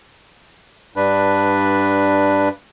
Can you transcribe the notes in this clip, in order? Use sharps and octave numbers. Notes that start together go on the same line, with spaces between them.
G2 D4 B4